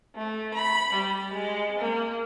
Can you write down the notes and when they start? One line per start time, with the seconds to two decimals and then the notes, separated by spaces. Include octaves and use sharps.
0.15 A3
0.54 B5
0.93 G3
1.34 G#3
1.78 A#3